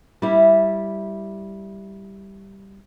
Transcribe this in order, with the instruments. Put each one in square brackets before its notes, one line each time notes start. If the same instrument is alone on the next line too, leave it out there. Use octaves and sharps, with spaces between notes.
[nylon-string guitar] G3 E4